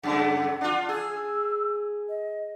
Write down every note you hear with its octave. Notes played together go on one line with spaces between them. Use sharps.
F#2 C#3 A3 F#5
D4 F4
G#4 E6
D#5